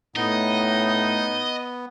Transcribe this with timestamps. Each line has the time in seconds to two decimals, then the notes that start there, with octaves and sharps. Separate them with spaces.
0.16 A2 B3 D#4 D#5